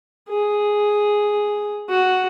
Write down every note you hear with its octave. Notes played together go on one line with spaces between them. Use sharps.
G#4
F#4